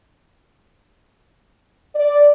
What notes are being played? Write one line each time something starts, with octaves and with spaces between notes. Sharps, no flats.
D5